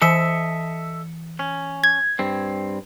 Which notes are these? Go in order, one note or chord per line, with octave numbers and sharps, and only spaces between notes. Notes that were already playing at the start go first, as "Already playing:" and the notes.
E3 A4 D#5 E5 C#7
C#4
G#6
G2 C4